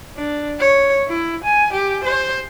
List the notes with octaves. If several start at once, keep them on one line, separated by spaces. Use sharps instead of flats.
D4
C#5
E4
G#5
G4
C5